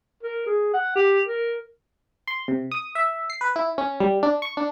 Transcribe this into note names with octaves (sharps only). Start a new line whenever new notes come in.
A#4
G#4
F#5
G4
A#4
C6
C3
D#6
E5
C7
B4
E4
C#4
G3
D4
C#6
D4